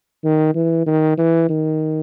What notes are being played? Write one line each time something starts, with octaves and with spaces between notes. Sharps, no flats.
D#3
E3
D#3
E3
D#3